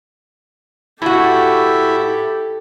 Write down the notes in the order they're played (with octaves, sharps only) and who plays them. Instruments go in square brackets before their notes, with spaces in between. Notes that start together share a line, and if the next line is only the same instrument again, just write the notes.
[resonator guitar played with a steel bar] A2 F#4 [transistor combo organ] E4 [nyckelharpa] G4 A4